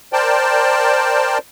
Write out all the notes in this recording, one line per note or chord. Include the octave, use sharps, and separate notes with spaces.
A#4 C5 D5 G5 A5